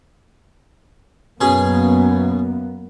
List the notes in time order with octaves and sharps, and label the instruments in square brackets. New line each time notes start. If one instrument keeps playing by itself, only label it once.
[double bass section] F#2 A#3 B3 [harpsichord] B2 C#4 G#4